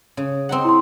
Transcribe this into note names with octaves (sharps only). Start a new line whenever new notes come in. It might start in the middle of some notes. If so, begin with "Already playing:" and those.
C#3
C4 D#4 F#5
E4 C6